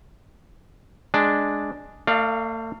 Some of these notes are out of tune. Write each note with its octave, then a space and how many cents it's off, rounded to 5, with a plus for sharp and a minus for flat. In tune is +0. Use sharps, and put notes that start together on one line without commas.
G#3 +0 D4 +0
A3 +40 D5 +25 F5 +0